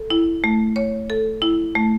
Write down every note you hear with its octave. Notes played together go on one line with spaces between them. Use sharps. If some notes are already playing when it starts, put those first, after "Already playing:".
Already playing: A4
E4
A3
C#5
A4
E4
A3